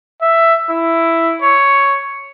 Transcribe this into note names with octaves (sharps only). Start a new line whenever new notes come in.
E5
E4
C#5